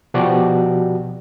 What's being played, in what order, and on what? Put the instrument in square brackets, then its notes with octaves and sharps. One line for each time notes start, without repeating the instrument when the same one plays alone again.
[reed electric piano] B2 F3 F#4 G4 D5